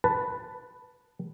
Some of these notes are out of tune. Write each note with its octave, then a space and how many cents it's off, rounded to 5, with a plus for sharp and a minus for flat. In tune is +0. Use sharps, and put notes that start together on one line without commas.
B4 +0 A5 +5